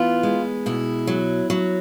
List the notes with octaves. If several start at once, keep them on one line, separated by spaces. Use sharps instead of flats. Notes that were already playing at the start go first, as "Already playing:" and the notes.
Already playing: E3 B3 F4
G#3
B2 E4
F#3
F#3